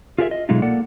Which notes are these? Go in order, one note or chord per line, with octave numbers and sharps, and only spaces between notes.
F4 G4 G#4 A#4 D5 E5
D#5
B2 F#3 G#3 A3 D#4 F4
A#3 A4 D5 F#5